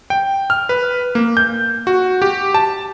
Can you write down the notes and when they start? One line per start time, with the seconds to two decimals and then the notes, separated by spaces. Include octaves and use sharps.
0.10 G5
0.50 F6
0.69 B4
1.15 A#3
1.37 G6
1.87 F#4
2.22 G4
2.54 A5